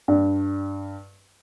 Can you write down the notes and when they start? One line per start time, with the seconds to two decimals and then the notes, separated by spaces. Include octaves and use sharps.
0.08 G2